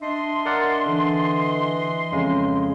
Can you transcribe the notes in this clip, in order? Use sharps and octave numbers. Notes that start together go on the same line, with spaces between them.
D4 D#5 E5 C6
A#4 D5 F#5
D3 E3
F2 C#3 G#3